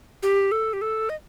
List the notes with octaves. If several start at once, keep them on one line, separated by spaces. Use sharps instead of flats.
G4
A4
G4
A4
D#5